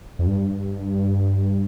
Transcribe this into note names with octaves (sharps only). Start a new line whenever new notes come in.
F2
G2